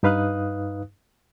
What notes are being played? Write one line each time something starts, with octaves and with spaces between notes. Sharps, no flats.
G2 D#4 B4 F5 D#6 F#6